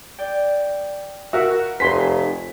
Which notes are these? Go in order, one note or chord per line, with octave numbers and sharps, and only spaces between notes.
D5 G5
F#4 A#4 E5 F#5
F1 B4 G#5 C6 B6